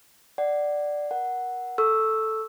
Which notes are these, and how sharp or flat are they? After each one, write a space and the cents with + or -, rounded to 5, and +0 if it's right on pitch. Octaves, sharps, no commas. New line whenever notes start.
D5 +5 F#5 +20
A#4 +25 F#5 +0
A4 +0 C#6 +0 E6 +0